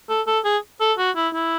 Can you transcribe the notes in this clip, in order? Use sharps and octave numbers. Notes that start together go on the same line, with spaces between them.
A4
A4
G#4
A4
F#4
E4
E4